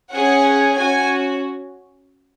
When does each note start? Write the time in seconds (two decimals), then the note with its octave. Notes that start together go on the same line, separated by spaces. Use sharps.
0.12 C#4 G#4 F#5
0.75 C#4 F#4 G#5